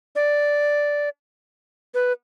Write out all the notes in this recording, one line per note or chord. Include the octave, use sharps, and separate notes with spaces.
D5
B4